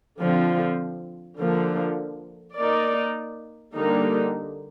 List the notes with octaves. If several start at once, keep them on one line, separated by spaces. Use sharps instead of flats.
D3 F3 C4
D3 F3 A#3
A#3 D#4 A#4 D5
D3 G3 A#3 D#4